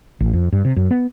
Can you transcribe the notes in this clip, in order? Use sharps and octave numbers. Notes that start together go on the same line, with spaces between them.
A1
F2
G2
C3
F#2
B3